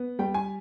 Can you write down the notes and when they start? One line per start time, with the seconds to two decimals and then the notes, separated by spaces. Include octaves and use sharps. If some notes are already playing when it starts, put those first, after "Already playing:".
Already playing: B3
0.19 G3 G5
0.34 G#5